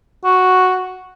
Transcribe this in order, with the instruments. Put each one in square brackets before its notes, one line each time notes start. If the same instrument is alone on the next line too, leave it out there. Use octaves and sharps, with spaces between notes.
[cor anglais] F#4